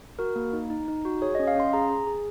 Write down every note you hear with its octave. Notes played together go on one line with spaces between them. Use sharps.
F#4 A#4
A#3
D#4
D#4
D#4
F#4
G#4 C#5
D#5
C#4
F5
C#4 C6
G#4 A#5
G#4
G#4